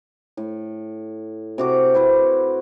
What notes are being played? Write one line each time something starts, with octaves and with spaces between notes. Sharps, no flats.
A2
C3 F#4 D6
C4 E4 B4 C5